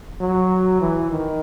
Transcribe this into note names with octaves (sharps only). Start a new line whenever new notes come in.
F#3
E3
D#3